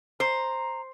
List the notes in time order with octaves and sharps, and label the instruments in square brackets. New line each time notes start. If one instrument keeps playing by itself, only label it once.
[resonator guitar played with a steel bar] C5 [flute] A#5